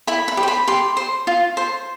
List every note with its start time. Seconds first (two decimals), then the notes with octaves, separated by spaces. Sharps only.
0.07 E4 B5
0.28 B5
0.37 G4
0.43 C5 B5
0.68 G4 C6
0.97 C5
1.27 F4
1.57 C5